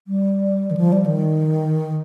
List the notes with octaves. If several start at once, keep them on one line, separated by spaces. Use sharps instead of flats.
G3
D#3
F3
G3
D#3